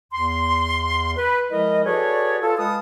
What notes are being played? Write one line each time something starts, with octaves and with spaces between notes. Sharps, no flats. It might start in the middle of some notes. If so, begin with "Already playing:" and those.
E2 C6
B4
F3 G#3 E4 A#4 D#5
F#4 G#4 A4 B4 C#5 D5
F4 A4
G#3 B4 F5 A5 D#6